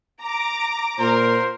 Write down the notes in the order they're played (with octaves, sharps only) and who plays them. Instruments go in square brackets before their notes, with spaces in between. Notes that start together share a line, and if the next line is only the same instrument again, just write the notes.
[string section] A#5 D6
[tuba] A#2 [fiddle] A#4 [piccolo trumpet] C5